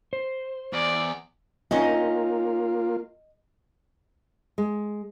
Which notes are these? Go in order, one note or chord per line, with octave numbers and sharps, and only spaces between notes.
C5
E2 D5
A#3 C4 C#4 D#4 F4 D#5
G#3